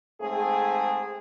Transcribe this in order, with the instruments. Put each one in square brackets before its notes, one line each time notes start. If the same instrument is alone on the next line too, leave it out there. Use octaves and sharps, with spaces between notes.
[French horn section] G#2 A3 C4 G#4